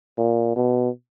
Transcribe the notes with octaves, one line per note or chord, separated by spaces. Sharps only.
A#2
B2